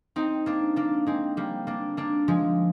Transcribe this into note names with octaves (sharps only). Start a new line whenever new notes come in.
C4 D#4
A#3 D4
A#3 D4
G#3 C4
G3 A#3
A#3 D4
A#3 D4
F3 G#3